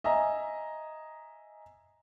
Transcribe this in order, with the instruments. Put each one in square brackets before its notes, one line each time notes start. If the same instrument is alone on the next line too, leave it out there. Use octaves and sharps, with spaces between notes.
[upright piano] D#5 E5 G#5 A#5